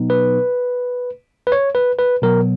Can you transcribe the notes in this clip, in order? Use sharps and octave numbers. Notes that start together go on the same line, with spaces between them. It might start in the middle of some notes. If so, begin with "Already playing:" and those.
Already playing: B2 F#3 B3 D#4
B4
B4
C#5
B4
B4
B2 F#3 B3 A#4